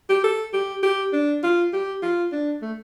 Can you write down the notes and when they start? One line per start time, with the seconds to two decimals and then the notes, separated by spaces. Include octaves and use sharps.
0.09 G4
0.24 A4
0.53 G4
0.83 G4
1.13 D4
1.43 F4
1.73 G4
2.02 F4
2.32 D4
2.62 A3